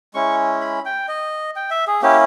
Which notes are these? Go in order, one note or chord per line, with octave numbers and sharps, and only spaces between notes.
G#3 C#4 E4 C#6
B5
G5
D#5
G5
E5
G#4
A#3 C#4 E4 G4